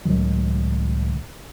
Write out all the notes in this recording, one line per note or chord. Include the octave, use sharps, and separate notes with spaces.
C#2 A2 D#3 F#3